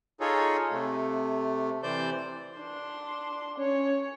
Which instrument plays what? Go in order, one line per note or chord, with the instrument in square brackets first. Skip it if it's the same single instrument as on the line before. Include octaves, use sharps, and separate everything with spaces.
[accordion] D#4 F4 G#4 A4 C#5
C3 A3
C3 E3 C5 D5 G6
[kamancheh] D4 C6
[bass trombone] C#4 [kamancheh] C#5